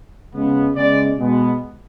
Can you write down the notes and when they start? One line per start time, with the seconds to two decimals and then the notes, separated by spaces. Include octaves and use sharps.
0.33 C#3 G#3 B3
0.75 C#3 G#3 B3 D5
1.17 B2 G#3 B3